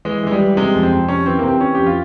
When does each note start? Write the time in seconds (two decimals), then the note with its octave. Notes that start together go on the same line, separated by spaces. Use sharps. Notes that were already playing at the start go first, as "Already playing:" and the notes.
0.05 E3 G#3
0.23 E3 G#3
0.31 G3
0.40 E3
0.57 C3 G#3
0.74 F2
0.83 C4
0.92 F2
1.09 C3 C#4
1.26 E3 C4
1.39 A#3
1.43 C3 C4
1.60 E3 C#4
1.75 F2 G4
1.86 F4